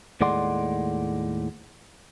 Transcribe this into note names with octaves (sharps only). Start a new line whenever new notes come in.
D#2 A2 G#3 D5 F#5 C6